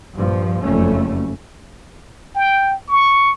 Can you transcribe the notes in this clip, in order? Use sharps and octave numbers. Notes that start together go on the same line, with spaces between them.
A#1 G2 F3
F#1 F2 G3 A3 C#4
G5
C#6